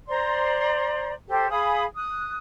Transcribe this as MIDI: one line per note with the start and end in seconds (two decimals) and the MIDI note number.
0.08 1.12 72
0.08 1.12 74
0.08 1.12 82
0.08 1.12 84
1.28 1.49 67
1.28 1.49 69
1.28 1.49 72
1.49 1.83 68
1.49 1.83 77
1.49 1.83 83
1.49 1.83 87
1.96 2.38 87
1.96 2.38 90